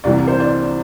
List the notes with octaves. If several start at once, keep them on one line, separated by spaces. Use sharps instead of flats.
C2 C3 E3 G3 D5
C5
D5